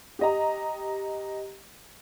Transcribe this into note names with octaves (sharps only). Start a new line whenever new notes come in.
G4 D#5 A#5